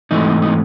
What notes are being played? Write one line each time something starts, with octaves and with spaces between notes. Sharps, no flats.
G#2 E3 A3 C4 D#4
D#4